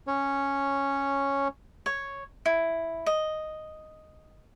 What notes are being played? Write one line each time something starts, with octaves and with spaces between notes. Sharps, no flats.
C#4 C#5
C#5
E4
D#5